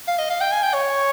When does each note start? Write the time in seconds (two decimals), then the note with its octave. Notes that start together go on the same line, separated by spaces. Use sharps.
0.08 F5
0.19 D#5
0.30 F5
0.41 G5
0.52 G#5
0.63 G5
0.74 C#5